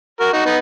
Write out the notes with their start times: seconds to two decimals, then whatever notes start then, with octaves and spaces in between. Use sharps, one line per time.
0.20 F#4 A#4
0.33 D#4 F#4
0.46 B3 D#4